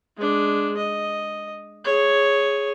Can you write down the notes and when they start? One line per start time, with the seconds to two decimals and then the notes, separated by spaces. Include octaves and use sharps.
0.17 G#3 D4
0.77 D#5
1.85 G#4 C#5